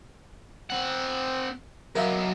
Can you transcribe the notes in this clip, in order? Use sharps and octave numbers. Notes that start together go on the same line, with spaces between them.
C4 F#5
F#3 D#4 A#4 E5 F5